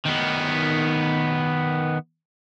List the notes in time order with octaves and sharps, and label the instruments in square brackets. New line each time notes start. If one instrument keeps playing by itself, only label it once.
[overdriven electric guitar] D#3 B3